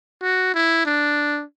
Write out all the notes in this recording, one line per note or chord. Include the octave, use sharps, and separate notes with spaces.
F#4
E4
D4